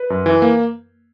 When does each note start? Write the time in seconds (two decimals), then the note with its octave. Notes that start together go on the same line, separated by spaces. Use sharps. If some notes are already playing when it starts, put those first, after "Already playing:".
Already playing: B4
0.10 F#2
0.26 E3
0.42 A#3